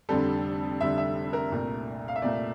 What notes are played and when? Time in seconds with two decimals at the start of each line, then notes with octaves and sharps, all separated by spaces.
0.09 F1 F2 D3 G3 A4
0.80 F1 F2 D3 G3 E5
0.98 E5
1.33 A#4
1.52 C2 A#2 A3
2.08 F5
2.16 E5
2.22 C2 A#2 A3 D5